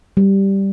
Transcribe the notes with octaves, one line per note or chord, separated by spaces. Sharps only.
G3